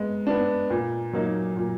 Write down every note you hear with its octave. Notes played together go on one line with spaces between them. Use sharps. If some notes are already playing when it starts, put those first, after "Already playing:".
Already playing: G#3 B3
B3 D4
A#2
F#3 A#3 D#4
A#2